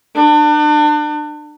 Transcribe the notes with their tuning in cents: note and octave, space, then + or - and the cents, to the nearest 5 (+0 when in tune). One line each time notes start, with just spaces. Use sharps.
D4 +35